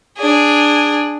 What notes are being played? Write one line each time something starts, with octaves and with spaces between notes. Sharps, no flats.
D4 G#4